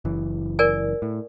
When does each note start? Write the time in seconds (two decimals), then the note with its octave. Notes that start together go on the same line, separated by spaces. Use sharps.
0.05 F#1 E3
0.59 A#4 D5 G#5
1.02 A2